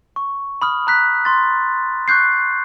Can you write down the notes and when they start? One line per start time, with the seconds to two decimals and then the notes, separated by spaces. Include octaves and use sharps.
0.16 C#6
0.62 B5 D#6 F6
0.87 A#5 F#6 B6
1.25 C6 A6
2.08 C#6 F#6 G6 C7